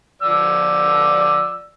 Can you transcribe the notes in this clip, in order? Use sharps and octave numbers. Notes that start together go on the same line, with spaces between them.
F3 D5 E6